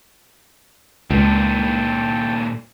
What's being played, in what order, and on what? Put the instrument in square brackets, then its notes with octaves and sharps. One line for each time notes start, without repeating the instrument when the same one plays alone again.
[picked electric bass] C#2 [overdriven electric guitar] G2 A#2 [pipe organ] G5 A5